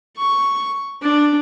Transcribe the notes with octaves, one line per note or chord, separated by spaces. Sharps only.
C#6
D4